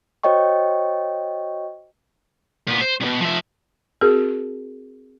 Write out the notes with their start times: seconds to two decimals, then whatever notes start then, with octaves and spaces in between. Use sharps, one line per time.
0.23 F#4 C5 C#5 D#5 G5 C#6
2.67 A#2 B3
2.80 C5
3.00 C2 B2
3.21 F3 E5
4.01 C4 F#4 G#4 A#4